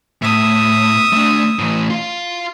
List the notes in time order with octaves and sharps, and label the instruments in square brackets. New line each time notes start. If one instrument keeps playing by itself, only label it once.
[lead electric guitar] A2 [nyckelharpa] E5 D#6
[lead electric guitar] A3 D4
A2 E3
F4 F5